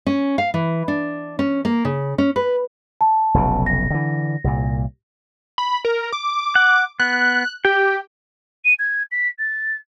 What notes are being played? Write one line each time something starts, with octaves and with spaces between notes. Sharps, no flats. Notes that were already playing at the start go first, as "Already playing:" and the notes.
C#4
F5
E3
D4
C#4
A#3
C#3
C#4
B4
A5
F1 B1 C#3
A#6
D3 E3
C2 A#2
B5
A#4
D6
F#5
B3 F#6
G4 G5
D#7
G#6
B6
A6